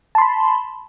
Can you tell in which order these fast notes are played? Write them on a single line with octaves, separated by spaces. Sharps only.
A5 C6 B5